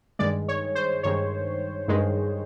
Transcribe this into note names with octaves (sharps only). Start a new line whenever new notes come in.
G2 D#3 G#3 D5
C#5
C5
G2 D#3 G#3 C#5
G2 D#3 G#3